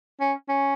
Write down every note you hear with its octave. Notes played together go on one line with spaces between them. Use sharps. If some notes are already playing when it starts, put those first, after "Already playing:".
C#4
C#4